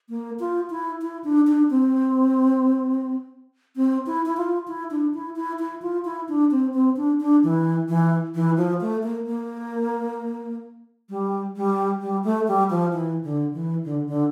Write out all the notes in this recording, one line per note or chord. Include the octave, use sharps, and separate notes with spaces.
A#3
F4
E4
E4
D4
D4
C4
C4
E4
E4
F4
E4
D4
E4
E4
E4
F4
E4
D4
C4
C4
D4
D4
E3
E3
E3
F3
A3
A#3
A#3
G3
G3
G3
A3
G3
F3
E3
D3
E3
D3
D3